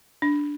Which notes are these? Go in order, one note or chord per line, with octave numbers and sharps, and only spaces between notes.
D4